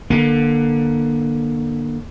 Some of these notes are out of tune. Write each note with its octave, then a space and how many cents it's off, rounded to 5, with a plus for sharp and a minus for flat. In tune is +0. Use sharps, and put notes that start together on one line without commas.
D3 +20 A#3 +30